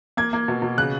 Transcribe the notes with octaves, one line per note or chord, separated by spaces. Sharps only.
A#3 G#6
A#3
B2
B2
C#3 F#6